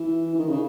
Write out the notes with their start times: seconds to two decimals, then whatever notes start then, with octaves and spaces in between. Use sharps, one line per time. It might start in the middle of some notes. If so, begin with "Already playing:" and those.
Already playing: E3
0.35 E3
0.39 D#3
0.49 C#3